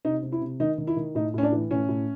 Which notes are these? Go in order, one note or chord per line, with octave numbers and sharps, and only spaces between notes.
C3 D#4
C3
E4
C3
D#3 D#4
D#3
E4
D#3
A2 D#4
A2 C#4
D4
E3
A2 C#4
A2